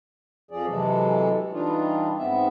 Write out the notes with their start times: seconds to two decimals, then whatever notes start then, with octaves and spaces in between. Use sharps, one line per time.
0.51 F2 F3 G#4 D5
0.68 C3 E3 F#3 G#3 A4
1.52 E3 G3 D4 D#4 F4
2.18 G#2 B3 C4 E5